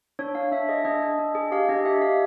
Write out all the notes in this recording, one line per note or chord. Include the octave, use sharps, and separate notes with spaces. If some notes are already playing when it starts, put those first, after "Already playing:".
D4 C#5
D4 F5
D4 E5
G#4 D#5
D4 D#5
D4
D4
G#4
G4 F5
D4 D#5
G4 E5
G4 F5